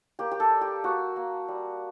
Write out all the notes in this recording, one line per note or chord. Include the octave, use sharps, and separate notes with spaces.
A#3 G4
G4
A4
G3
G4
A#3 F#4
A#3
G3